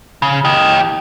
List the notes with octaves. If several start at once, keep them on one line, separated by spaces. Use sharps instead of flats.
C#3
G4 D#5